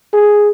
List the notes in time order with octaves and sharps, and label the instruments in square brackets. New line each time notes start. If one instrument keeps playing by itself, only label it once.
[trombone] G#4